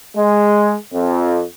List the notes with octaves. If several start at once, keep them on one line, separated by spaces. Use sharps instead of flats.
G#3
F2